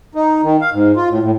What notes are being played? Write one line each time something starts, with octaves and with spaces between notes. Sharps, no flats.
D#4
D#3
F5
G#2
F4
A2
A2